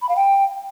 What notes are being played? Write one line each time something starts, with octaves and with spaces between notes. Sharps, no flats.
B5
F5
G5